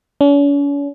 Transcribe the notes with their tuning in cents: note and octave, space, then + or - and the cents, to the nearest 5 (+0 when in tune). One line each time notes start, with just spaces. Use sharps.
C#4 +45